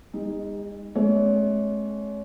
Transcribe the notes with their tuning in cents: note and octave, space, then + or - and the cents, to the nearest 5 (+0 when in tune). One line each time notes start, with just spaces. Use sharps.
G#3 -45 D#4 +0
G#3 +40 C#4 -40 C#5 +35